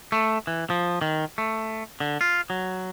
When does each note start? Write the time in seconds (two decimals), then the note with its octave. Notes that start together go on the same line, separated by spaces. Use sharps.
0.12 A3
0.47 E3
0.70 F3
1.01 D#3
1.38 A3
2.00 D3
2.21 F4
2.50 F#3